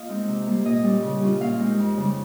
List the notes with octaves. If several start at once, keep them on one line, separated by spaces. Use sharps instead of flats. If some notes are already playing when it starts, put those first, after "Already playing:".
Already playing: A#3 F4 D#5 F5
G#3 C4 D#4
C3
G3 A#3
A#2 D#5
G3 C#4
C#3
G3 C#4 F4
A#2 F5
G#3 C4 D#4
F2
C#3 G3